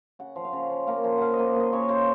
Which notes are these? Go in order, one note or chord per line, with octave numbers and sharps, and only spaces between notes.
C#3 F#5
F3
F5
C#3
F3
A#3 F5
F3
F3 F5 F#5
D#5
A#3
A#3 D#5
C#3 C#5
C#3 C5